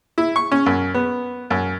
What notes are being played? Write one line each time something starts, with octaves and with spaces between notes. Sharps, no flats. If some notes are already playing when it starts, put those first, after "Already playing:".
E4
C#6
C#4
F#2
B3
F#2